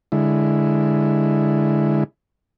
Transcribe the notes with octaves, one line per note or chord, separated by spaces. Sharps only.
D3 G#3 E4